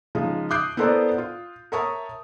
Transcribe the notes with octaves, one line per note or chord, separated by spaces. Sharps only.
C#3 F3 G#3 D#4
D6 D#6 F#6 G6 C7 D7
B3 E4 A4 A#4 C5 D5
F4
A#4 C#5 E5 A5 C#6 D#6